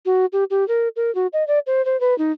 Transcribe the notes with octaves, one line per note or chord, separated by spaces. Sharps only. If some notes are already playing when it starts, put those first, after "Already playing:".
F#4
G4
G4
A#4
A#4
F#4
D#5
D5
C5
C5
B4
D#4